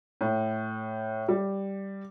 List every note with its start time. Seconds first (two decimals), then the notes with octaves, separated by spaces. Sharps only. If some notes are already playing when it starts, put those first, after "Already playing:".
0.21 A2
1.28 G3